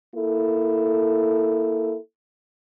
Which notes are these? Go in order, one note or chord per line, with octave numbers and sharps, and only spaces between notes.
A#3 E4 A4